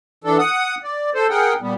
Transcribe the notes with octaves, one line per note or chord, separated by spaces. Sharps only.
E3 D4 A4
F#5 D#6
D5
A4 C5
G#4 A#4 F#5 G5
A#2 G3 B3